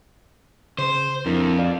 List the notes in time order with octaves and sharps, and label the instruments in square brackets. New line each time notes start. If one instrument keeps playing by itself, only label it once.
[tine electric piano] C#3 [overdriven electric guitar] C5
[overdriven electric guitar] F2 [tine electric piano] D4 E4 A#4
[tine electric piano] F4 D5 F5